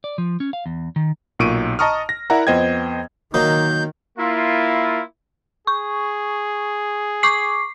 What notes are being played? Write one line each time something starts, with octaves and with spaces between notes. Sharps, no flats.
D5
F3
C#4
F5
E2
D#3
B1 A#2 C#6 D7 D#7
D#5 A5 A#5 C#6 D#6 F6
A#6
E4 A#4 D5 E5 F#5 A#5
F2 B3 C5 D#5 G5 G#6
D#3 F#3 A#3 D#4 G6
A#3 E4 F4
G#4 C#6
C#6 D6 C7